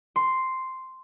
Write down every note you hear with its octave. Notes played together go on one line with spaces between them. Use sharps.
C6